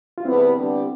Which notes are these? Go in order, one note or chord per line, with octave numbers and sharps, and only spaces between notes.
F4
E2 C3 G3 B3 C4 E4
D3 G3 B3 D4 G4